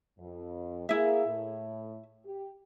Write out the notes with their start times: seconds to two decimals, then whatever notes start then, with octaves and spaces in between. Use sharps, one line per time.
0.18 F2
0.89 A#3 E4 G#4 E5
1.26 A2
2.25 G4